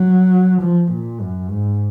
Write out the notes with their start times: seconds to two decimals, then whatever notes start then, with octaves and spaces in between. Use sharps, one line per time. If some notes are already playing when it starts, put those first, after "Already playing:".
Already playing: F#3
0.63 F3
0.92 A#2
1.22 F#2
1.51 G#2